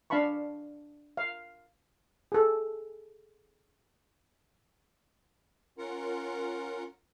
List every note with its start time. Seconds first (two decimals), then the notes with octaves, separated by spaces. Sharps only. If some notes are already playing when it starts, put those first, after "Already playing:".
0.10 D4 F5 A5 B5 C#6
1.17 F5
2.32 G#4 A4
5.78 C#4 F4 A#4 F#5